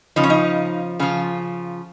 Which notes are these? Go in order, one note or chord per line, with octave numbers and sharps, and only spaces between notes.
C#3 F3 D#4
C#4
D#4
C#3 F3 F4